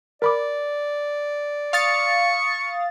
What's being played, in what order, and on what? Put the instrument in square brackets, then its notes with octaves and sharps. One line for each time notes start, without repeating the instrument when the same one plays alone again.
[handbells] A#4 B5 D6 [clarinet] D5
[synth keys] F5 D#6 A6 [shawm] C#6